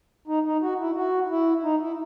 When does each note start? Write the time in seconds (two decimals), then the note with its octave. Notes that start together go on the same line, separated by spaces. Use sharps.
0.27 D#4
0.46 D#4
0.62 F#4
0.79 E4
0.96 F#4
1.30 E4
1.64 D#4
1.80 E4